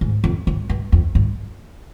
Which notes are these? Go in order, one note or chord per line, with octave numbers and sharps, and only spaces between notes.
G#2
F2
G2
G2
F2
G2